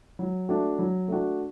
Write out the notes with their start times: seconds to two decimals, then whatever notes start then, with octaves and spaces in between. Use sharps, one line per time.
0.19 F#3
0.49 A3 D4 F#4
0.79 F#3
1.08 A3 D4 F#4